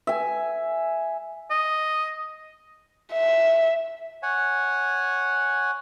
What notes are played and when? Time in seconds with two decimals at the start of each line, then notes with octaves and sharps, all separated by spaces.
0.07 E5 G#5
1.51 D#5
3.13 E5
4.23 C#5 F#5 G#5